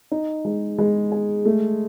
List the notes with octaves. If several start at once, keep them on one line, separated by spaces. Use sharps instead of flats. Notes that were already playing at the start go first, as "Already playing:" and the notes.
D#4
G#3
G#3
G#4
A3